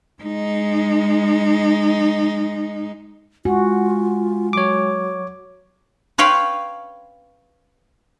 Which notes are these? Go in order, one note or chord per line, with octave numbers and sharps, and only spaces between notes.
G#3 D#4
G#3 F4 F#4
F#3 C#5 D6
B4 C#5 F5 G5 B5 C6